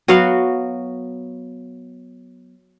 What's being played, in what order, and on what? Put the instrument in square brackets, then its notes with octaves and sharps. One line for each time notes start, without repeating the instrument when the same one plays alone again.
[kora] F#3 B3 F#4 F5